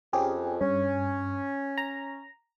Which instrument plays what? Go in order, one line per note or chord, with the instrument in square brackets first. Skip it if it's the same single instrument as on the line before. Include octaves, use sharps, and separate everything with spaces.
[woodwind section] F2 [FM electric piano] C#4 G4 G#4
[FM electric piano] G2 [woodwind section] C#4
[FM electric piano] A#5